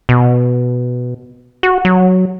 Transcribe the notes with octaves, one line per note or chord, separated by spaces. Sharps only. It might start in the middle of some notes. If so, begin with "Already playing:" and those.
B2
F#4
F#3